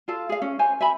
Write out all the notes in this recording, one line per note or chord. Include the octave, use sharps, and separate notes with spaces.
F4 A4 F5
G#4 F5
C#4
C5 C#5 G#5
E5 G#5 B5